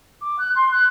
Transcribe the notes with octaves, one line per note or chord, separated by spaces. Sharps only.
D6
F#6
C6
F#6